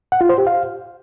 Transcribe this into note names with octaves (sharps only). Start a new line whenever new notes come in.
F#5
F4
C5
G4
F5